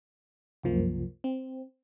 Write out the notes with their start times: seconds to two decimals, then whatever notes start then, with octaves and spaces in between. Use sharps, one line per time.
0.63 C2 F#2 F3 A#3
1.24 C4